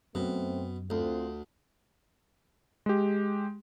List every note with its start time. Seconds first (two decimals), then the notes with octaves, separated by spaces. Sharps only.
0.15 F#2 B2 A3 C4
0.90 D2 C4 F4
2.86 G#3 G4